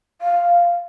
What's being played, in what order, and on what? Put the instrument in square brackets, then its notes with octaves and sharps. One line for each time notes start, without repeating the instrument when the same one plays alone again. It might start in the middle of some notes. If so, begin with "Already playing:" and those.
[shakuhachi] F5